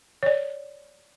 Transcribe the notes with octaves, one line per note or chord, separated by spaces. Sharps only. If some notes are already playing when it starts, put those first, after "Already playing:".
C#5 D5